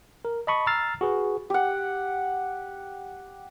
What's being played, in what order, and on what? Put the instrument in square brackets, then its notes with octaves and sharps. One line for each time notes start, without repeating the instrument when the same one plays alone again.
[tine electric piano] A#4
D#5 A5 B5 C#6 D#6
A#5 E6 F6 A6 C7
F#4 G#4 B4
[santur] G4 F#5